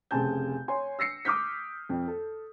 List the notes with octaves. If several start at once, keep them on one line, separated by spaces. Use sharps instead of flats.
F1 C#3 C4 G#5 A5 G6
C#5 G#5 C6
E6 A#6 C7 C#7
D6 D#6 F6 G6 B6
F2
A4